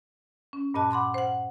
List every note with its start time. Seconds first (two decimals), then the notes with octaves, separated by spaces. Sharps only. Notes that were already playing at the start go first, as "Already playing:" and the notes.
0.53 C#4
0.74 G2 A#2 D#5 A5 F#6
0.91 F#5 B5 C6 D6
1.14 C5 F#5